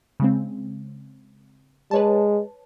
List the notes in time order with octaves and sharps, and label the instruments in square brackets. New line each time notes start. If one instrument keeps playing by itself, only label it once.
[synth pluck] C#3 G#3 C4
[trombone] G#3 [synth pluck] B4 C#5 A5